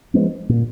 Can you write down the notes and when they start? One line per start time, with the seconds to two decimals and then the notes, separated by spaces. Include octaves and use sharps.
0.14 F3 G#3 B3
0.49 A#2